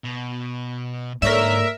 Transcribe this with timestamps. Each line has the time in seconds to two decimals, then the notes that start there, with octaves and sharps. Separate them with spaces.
0.04 B2
1.22 G#2 D3 A#3 A4 A#4 C#5 D5 E5